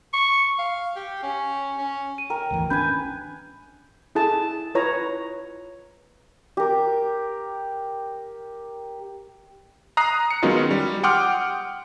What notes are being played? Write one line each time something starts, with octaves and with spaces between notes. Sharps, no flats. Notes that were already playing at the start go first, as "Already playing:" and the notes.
C#6
F5
G4
C#4
C#4
D#7
A#4 G5
G#1 D2 E3
G#1 C#4 D4 B4 G#5 G6
E4 G#4 A4 A5
E4 F4 B4 C#5 A#5
G4 A#4
A#5 D#6 F#6 C7
C#7
D#3 F#3 G#3 B3 C#4 F4
G3
F#5 G5 C6 D6 D#6 F6